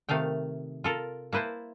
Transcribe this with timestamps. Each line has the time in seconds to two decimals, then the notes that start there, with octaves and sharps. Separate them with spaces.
0.09 C3 D#3 A3 F5 G5
0.84 F4 A4 A#4
1.33 A#3 E4 B4 C5 A5